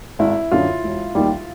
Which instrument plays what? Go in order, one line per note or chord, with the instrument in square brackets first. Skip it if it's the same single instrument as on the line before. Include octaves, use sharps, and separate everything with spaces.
[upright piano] G#1 [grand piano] E4
[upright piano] F#2 D3 [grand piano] F4
[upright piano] E1
D#2 D#3 G3